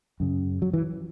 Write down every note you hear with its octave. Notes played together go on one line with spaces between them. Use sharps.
F#2 C#3
F#3
E3